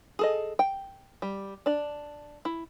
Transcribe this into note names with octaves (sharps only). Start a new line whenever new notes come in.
G#4 A4 D#5
G5
G3
D4 D5
E4